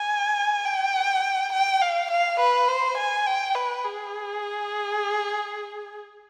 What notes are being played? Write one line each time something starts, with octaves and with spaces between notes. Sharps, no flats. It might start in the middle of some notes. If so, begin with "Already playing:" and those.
Already playing: G#5
G5
G5
F5
F5
B4
C5
G#5
G5
B4
G#4